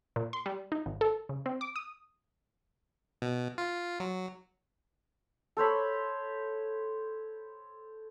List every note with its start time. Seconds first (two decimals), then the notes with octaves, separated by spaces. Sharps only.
0.16 A#2
0.33 C6
0.46 G3
0.72 D#4
0.86 G#1
1.01 A4
1.29 C#3
1.46 C4
1.61 D6
1.76 D#6
3.22 B2
3.58 F4
4.00 F#3
5.57 A4 C5 C#5 B5